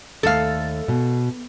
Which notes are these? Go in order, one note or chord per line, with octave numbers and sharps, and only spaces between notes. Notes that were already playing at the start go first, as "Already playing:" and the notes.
D#2 A3 A4 F5
B2